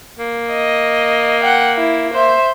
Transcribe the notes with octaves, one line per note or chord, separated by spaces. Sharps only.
A#3
D#5
F#5 G5
E4
C5 E5